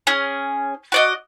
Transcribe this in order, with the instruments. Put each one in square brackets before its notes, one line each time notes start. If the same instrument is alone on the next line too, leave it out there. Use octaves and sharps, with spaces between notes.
[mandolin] C#4 G#4
F#4 D5 D#5